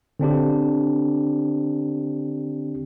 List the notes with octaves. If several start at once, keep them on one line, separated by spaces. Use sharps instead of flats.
D3 C4 D4 G4